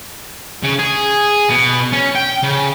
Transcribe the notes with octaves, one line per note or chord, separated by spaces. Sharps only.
C#3
G#4
B2
C#4
G5
C#3